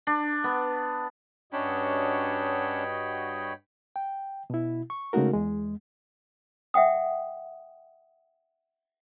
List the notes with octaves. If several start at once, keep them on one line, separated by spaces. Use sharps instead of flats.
D4
B3
G2 C#4 D4 F#4 C#5 D#5 G5 B5
G5
B2 E4
C#6
C#3 G#3 A3 D#4 F#4 A#4
E2 G#3
E5 F#5 G5 D#6